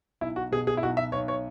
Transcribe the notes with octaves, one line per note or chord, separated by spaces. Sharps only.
B1 E4
F#4
B2 G#4
G#4
E4
B1 F#4
E5
B1 C#5
C#5